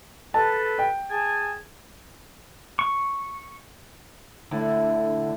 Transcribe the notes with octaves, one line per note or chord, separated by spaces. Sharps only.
A4 B4 A5
G5
G#4 G#5 A5
C#6
A2 D3